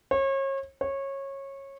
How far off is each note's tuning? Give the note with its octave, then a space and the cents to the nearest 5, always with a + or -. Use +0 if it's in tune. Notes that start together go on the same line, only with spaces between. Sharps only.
C#5 -35
C#5 -20